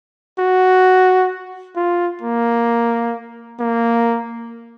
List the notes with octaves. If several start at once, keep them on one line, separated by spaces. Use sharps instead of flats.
F#4
F4
A#3
A#3